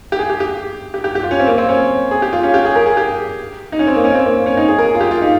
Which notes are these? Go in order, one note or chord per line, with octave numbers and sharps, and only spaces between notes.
G4
G#4
G4
G4
G4
G4
G4
F4
C#4
C4
A#3
C4
C#4
G#4
G4
F4
C#4
G4
G#4
A#4
G#4
G4
D#4
C#4
C4
A#3
C#4
C4
A#3
C#4
D#4
G#4
A#4
G#4
F4
G4
F4
D#4